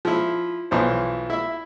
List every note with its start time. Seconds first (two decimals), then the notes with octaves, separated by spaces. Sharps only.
0.05 F3 E4
0.71 B1 E3 F3 C5
1.30 E4 E5